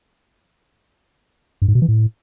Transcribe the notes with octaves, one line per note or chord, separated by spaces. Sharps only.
G2
G#2
B2
E3
A2